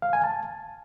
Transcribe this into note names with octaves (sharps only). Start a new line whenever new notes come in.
F5
G#5
A5